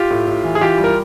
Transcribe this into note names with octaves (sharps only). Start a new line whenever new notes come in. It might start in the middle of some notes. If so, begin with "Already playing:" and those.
Already playing: F4 G4
A2
A2
E3
G#4
E3 F4 G4
G3
A#4